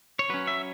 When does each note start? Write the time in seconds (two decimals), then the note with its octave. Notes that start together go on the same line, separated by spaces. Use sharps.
0.19 C#5
0.30 F#3 C#4 B4
0.47 E5